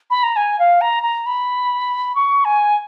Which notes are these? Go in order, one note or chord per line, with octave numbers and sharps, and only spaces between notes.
B5
A#5
G#5
F5
A#5
A#5
B5
C#6
G#5